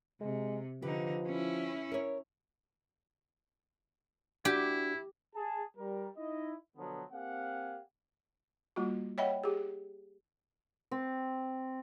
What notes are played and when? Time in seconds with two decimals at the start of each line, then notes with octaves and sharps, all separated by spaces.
0.21 C3 G#3
0.82 D3 F3 D#4 G4 B4
1.27 C#4 E4
1.92 A#4 C#5
4.45 D4 E4 F#4 G4
5.35 G#4 A5
5.77 G3 A#4
6.17 D#4 E4 D#5
6.77 B2 D3 F3 F#3 B3
7.12 A#3 C4 G4 F5 F#5 G#5
8.76 G3 A#3 F4 F#4
9.18 C#5 D#5 E5 F#5 G5 B5
9.44 G4 G#4
10.91 C4